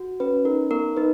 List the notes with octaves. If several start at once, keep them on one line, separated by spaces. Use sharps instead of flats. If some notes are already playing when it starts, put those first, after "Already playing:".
Already playing: F#4
C#4 B4
D#4 A#4
B3 A#4
D#4 B4